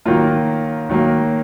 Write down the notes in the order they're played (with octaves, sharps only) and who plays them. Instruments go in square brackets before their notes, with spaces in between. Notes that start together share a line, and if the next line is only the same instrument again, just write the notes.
[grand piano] D#3 F#3 A#3 F4
D#3 F#3 A#3